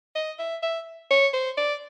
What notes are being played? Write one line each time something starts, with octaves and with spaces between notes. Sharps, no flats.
D#5
E5
E5
C#5
C5
D5